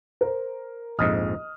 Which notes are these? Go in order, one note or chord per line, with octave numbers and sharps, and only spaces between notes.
A#4 C5
A#1 F2 G#2 D#5 D#6 F6